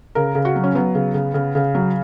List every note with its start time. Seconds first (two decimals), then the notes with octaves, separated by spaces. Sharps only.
0.15 C#3 A#4
0.35 C#3
0.45 F#4
0.56 F#3
0.64 C#4
0.75 F#3 B3
0.95 C#3
1.14 C#3
1.34 C#3
1.55 C#3
1.75 F#3